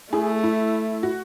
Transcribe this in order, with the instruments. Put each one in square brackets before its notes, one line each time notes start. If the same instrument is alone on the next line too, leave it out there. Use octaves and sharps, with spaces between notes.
[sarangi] A3 [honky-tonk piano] E4 G#4
[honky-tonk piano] E4
F#4